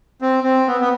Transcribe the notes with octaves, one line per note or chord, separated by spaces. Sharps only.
C4
C4
B3
B3